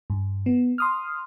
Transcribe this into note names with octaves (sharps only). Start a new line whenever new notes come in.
G2
B3
C6 D#6 F6